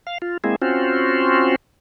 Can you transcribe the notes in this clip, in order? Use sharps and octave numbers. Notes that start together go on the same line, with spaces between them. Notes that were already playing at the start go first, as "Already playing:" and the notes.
F5
F4
G#3 A#3 C4 E4 G#4
C4 C#4 F4 F#4 C5